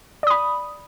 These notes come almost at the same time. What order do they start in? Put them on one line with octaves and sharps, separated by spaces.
D5 D#6 B5